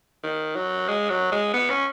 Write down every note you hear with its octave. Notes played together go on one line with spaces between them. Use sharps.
D#3
F#3
G#3
F#3
G#3
B3
C#4